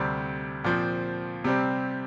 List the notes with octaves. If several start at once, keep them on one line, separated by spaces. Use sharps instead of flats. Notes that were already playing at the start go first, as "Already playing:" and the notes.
Already playing: D2 C3 G3 C4
A#2 F3 C4
C3 G3 C4